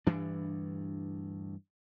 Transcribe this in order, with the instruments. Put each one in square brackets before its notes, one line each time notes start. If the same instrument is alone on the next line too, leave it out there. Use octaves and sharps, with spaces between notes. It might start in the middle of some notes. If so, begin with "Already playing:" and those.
[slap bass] D2 G2 E3 D4